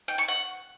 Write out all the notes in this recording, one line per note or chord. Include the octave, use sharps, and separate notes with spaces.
G5
C#6
F#5